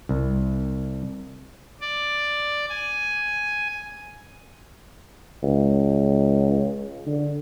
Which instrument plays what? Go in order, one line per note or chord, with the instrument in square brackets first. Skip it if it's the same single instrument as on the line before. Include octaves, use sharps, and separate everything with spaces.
[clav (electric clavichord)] C2
[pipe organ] D5
G#5
[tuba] C#2
D3